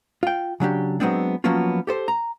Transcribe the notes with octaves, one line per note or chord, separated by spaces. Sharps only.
F4 G5
C#3 F#3 D4 G4
F#3 G#3 B3 C4 D4
F3 F#3 A#3 B3 C#4 F4
G4 A4 C5
A#5